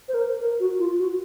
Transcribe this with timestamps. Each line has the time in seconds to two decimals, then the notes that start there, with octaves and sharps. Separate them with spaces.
0.09 C5
0.14 A#4
0.40 A#4
0.60 F#4
0.79 F4
0.99 F#4